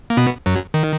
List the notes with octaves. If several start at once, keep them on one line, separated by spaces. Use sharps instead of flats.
A#3
B2 B3
F#2 F#3
D#3